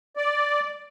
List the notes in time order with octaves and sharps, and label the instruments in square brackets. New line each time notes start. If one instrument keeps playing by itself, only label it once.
[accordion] D5